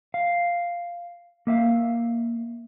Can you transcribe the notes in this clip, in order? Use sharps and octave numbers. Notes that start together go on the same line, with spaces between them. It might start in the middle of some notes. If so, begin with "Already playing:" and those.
F5
A#3 E5 F5